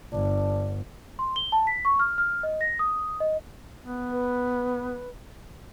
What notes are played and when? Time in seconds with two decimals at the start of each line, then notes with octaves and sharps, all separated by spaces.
0.13 G1 D4
1.19 C6
1.36 G7
1.52 A5
1.67 B6
1.85 C#6
1.99 F6
2.18 F6
2.43 D#5
2.61 A#6
2.79 D#6
3.20 D#5
3.85 B3
4.11 B4